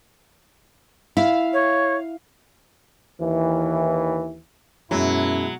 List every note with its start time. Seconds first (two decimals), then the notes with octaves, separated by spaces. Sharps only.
1.17 E4 F5
1.53 C#5
3.20 D#2 E3
4.91 F#2 B2 F#3 G#3 E4